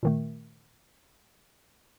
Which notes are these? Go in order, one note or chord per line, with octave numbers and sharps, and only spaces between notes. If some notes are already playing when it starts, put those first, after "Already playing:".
A#2 D#3 A3